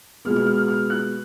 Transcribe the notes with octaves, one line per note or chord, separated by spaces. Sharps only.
B2 G#3 B3 F6
F6
F6
F6
F6
F#6